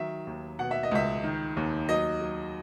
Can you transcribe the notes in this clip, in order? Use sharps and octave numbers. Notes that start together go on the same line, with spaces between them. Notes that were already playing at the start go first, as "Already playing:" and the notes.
Already playing: D#3 F#3 E5
D#2
B2 F#5
E5
D#5
C#2 E5
D#3
D#2
F#3 D#5
F#3